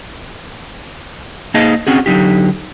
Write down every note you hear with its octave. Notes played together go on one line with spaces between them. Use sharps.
A#3 D#4 G#4 D#5 F5 A5
C4 C#4 F#4 G#4
D3 F#3 D#4 G4